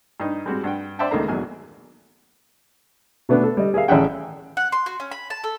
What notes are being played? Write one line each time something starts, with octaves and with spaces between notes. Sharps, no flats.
G2 D#4
G3 G#3 C4 F#4
G2 F#5 G5
C5 D5 E5 F#5 G5 A5
C#2 D#3 A3 A#3 A#5
A#1 E2 G#2 F#3 G#5
B2 A3 B3 D4
A4
G3 D#5
G#4 A#4 E5 F5
A1 C#4 G#4 E5 F#5 G5
F#5
C6
F#4
C#4
B5
A5
A4